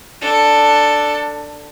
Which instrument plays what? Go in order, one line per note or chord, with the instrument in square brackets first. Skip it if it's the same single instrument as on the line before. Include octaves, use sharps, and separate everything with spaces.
[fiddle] D4 A4